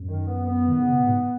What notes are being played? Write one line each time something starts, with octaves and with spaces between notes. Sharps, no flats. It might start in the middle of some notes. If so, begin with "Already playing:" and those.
Already playing: F#2
D#3
B3
B3
D#3
C#3
B2
G#2